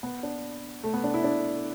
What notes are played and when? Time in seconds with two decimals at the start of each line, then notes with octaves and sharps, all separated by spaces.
0.03 B3
0.23 D4
0.84 A3
0.94 B3
1.04 D4
1.14 E4
1.24 D4